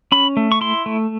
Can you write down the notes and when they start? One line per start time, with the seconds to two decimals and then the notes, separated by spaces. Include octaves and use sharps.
0.12 C#4 B5
0.37 A3
0.52 C#6
0.61 E4 C6
0.86 A3